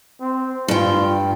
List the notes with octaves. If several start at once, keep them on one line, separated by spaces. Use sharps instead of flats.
C4
G2 F4 G5